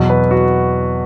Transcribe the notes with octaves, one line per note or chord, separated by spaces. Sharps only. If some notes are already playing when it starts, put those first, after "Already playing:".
Already playing: E2 B2 F#3
B4
F#4